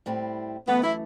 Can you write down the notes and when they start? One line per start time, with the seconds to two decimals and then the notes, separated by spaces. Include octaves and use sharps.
0.06 A2 G3 C4 E4
0.67 F#2 E3 A3 B3
0.82 E4